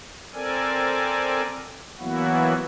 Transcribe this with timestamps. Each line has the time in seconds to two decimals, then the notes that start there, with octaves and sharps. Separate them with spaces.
0.34 C4 A4 A#4 D5 G#5
2.00 E3 F#3 A#3 B3 E4 F#4